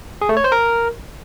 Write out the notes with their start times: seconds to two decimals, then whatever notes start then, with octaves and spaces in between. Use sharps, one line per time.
0.22 G#4
0.29 A3
0.37 C#5
0.44 C5
0.52 A#4